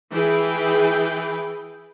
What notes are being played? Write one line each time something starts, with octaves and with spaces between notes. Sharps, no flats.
E3 E4 G#4 B4 G5